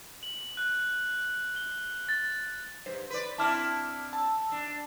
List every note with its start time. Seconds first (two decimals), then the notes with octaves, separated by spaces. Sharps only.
0.23 F#7
0.57 F#6
1.56 G7
2.09 A6
2.86 G2 C5
3.10 B4 D5
3.38 C4 D4 E4 A5 D6 F6
4.12 A5 E6
4.52 D4